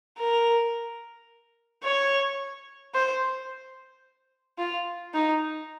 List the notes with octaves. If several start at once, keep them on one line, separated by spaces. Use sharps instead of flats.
A#4
C#5
C5
F4
D#4